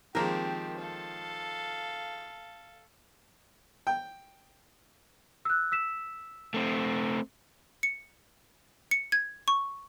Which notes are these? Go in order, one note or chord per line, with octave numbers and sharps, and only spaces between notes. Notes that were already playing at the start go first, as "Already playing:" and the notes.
D#3 F3 G#3 A#3 C4 G4 A#4
A4 F5
G5
E6 F#6
E6 B6 E7
A3 C4
C#7
C#7
G#6
C#6